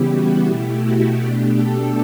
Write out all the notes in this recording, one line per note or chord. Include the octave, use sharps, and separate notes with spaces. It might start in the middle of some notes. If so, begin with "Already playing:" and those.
Already playing: C#3 E3 G3 B3 E4 G4
F#4
B2 A3 E4 G4
F#4
B2 A3 D4 G4
A4